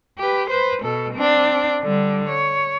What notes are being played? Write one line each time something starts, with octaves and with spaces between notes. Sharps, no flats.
G4 B4
B4 C5
B2 A4
C4 D4
D3 G3
C#5